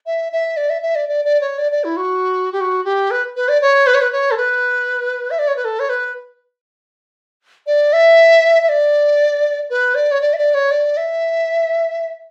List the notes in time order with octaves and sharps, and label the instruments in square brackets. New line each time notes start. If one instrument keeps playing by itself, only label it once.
[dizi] E5
E5
D5
E5
E5
D5
D5
D5
C#5
D5
D5
E4
F#4
G4
F#4
G4
B4
B4
D5
C#5
B4
C#5
B4
C#5
A4
B4
E5
D5
C#5
B4
A4
C#5
B4
D5
E5
E5
D5
B4
D5
C#5
D5
E5
D5
C#5
D5
E5